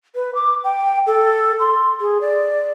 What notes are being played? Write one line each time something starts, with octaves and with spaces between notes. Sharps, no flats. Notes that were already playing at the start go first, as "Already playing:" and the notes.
B4
D6
G5
A4
C6
G#4
D5